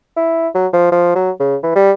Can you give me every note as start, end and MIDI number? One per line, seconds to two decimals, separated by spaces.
0.17 0.48 64
0.55 0.67 54
0.73 0.91 53
0.92 1.12 53
1.15 1.31 54
1.40 1.56 49
1.63 1.73 52
1.76 1.92 55